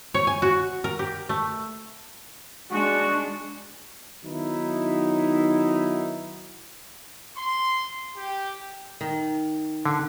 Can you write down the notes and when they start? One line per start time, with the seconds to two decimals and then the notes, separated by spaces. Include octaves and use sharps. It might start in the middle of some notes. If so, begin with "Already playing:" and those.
0.14 C#5
0.27 G#5
0.42 F#4
0.84 A#4
0.99 G4
1.29 A3
2.71 G#3 D4 F#4
4.24 D#3 F#3 B3 D#4 E4
7.37 C6
8.16 G4
9.01 D#3
9.85 D3